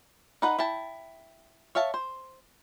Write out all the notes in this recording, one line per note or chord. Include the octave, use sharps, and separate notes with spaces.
D#4 B4 F#5
E4 G5 A5
C#5 E5 F5 A5
C5